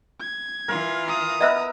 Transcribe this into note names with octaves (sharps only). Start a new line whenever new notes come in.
G#6
E3 F4 A#4
A#5 D#6
B3 A#4 D#5 E5 E6 F#6